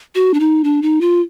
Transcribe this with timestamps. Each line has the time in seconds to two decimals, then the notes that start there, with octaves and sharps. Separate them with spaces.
0.15 F#4
0.34 D4
0.40 D#4
0.64 D4
0.82 D#4
1.01 F4